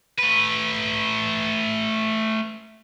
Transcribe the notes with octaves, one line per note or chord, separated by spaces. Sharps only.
A3 B4